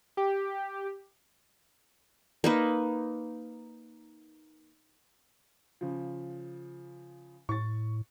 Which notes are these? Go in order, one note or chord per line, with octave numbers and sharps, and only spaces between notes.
G4
A#3 D#4 B4
C#3 F3
A2 C#6 A6